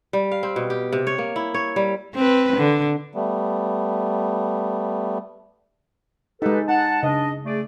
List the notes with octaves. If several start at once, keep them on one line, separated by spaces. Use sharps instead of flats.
G3
F5
C4
B2
G4
C3
C#5
A#3
E4
C#5
G3
C4 B4
D3
G3 A3 B3
G#3 D#4 G4 A4 B4
D#4 F#5 A5
C#3 D4 D#5
A3 G#4 D5